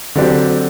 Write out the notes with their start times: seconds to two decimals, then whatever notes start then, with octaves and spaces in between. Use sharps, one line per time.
0.15 D3 F#3 C4 G4 D5